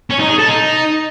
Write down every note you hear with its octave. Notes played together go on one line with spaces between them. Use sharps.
C#4
D#4
G#4
A4
D#4